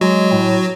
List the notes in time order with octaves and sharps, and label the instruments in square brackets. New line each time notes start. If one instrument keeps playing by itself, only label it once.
[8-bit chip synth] F#3 F#4 [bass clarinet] G#3
[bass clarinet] A2